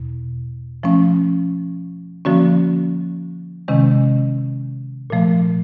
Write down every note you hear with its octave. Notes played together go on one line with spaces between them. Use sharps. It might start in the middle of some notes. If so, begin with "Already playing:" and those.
Already playing: E2 B2
F3 A3 C#4
D3 F3 A#3 C#4 F#4
C3 D#3 G#3 C#4
A#2 F3 A3